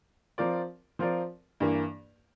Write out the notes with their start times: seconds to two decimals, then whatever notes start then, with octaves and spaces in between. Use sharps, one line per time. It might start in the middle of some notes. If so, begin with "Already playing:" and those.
0.38 F3 C4 F4 A#4 D5
0.99 F3 C4 F4 A#4 D5
1.60 G2 E3 A#3